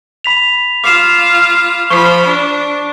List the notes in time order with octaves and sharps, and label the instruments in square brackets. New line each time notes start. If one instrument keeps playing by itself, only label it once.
[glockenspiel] B5 B6 F7
[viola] F4 F5 [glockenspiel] D6 C7 E7
[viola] F3 B5 [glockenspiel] C#6
[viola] D4